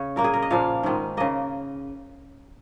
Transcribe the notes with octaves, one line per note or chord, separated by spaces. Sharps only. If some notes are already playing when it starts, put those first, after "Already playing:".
Already playing: C#3 C#5
A#2 A#3 A#4
G#4
A#4
D#5
A#2 F3 A#3 F5
G#2 D#3 G#3
C#3 A#3 D#5